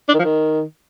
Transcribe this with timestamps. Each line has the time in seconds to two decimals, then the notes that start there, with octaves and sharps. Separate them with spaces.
0.09 D4
0.14 D#3
0.19 F3
0.25 D#3